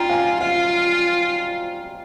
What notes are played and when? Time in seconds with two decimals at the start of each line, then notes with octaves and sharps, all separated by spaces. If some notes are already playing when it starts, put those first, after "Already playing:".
Already playing: F4 G5 A#5
0.09 F5 G#5
0.41 F4 F5